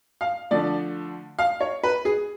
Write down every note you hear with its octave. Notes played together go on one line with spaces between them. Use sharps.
F5
D3 F3 A3 D4 D5
F5
C#5
B4
G#4